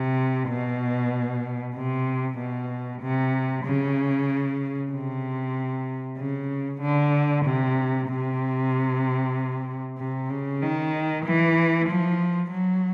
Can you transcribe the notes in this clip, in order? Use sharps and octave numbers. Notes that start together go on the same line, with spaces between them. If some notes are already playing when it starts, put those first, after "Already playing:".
Already playing: C3
B2
C3
B2
C3
C#3
C3
C#3
D3
C3
C3
C3
C#3
D#3
E3
F3
F#3